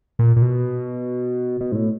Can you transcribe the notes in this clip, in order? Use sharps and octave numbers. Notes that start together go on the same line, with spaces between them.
A#2
A#2
B2
B2
G#2
A2